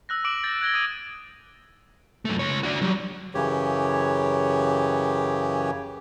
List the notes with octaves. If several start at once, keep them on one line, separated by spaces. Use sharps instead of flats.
E6 F#6 A#6
D6 D7 F#7
G6 A6 A#6
F#6 G#6 A#6 G7
D#6 A6 D#7
F#2 A3
C#2 C#5
D4 F#4
F#3 G3
F#2 C#3 E3 G4 C#5